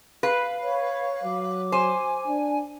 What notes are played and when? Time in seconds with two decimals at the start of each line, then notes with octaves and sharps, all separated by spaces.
0.23 B4 F5
0.62 C#5
1.23 F#3 D6
1.72 C5 G#5
2.27 D4